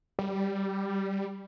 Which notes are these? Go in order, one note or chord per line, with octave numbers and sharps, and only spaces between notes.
G3